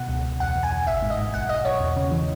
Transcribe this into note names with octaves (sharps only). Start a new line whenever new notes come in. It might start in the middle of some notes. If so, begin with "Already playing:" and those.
Already playing: B2 F#5
C#2
C#2
E2 F#5
E2
G#5
E2
G#1 E5
G#2
D#5
G#2
B1 F#5
B1 D#5
B1 C#5
E2
C#3
E3